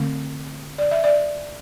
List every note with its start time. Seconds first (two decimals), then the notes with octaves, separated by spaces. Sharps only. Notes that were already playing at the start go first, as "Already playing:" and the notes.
Already playing: D3 A3 C4
0.78 D5
0.91 E5
1.04 D5